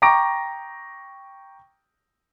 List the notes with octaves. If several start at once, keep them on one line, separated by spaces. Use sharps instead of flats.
G5 A#5 C#6 D6 A#6 D7